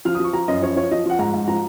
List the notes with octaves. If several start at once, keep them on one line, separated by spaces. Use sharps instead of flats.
F3 F6
D#6
F3 C#6
F3 A#5
F#2 D#5
F3 C#5
F3 C#5
F3 D#5
F3 F#5
G#2 A#5
G#2
F3 A#5